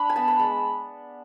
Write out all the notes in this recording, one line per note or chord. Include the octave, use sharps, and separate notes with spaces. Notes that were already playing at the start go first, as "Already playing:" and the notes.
Already playing: D4 B5
G#5
B3 A5
B5
G#3 A5